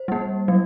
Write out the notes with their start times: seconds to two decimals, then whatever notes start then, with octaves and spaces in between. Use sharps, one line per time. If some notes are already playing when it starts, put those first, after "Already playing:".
Already playing: C5
0.08 G3 A#3
0.48 F#3